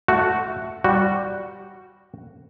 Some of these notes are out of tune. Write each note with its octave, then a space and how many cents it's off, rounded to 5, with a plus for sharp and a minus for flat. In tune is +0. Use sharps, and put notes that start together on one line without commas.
A3 +0 F#4 +0
G3 -5 F#4 +0